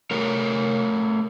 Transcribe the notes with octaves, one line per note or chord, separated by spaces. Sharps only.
A3 A#4 C#5 F#5